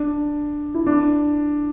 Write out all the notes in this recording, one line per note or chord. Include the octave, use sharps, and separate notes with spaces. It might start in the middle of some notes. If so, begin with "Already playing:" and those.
Already playing: D4
E4
D4